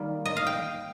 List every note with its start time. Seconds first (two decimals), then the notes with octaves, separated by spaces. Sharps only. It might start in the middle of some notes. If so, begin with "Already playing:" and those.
Already playing: D#3 G3 A#3
0.26 D#5
0.37 F5
0.47 G5